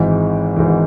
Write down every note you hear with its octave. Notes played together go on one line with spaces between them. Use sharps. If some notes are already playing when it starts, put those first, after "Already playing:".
Already playing: G#1 G#2 E3
G#1 G#2 E3